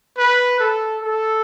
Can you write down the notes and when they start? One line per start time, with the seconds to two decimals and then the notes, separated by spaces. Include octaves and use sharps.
0.18 B4
0.60 A4
1.03 A4